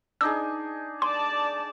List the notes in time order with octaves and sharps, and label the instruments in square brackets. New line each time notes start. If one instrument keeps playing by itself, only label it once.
[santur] D4 D#4 G#4 [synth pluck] E6
[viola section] D5 A5 [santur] G#5 [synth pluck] C6